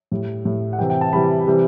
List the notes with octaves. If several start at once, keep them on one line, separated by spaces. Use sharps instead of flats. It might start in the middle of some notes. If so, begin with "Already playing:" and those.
A2 G3
A2 G3
F#5
C3 E3 G3 G5
G5
A5
C3 E3 G3 B5
C3 E3 G3